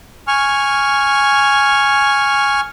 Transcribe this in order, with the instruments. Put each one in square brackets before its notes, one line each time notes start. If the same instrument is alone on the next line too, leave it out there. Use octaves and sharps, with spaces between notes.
[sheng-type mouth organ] G#5 C#6 F6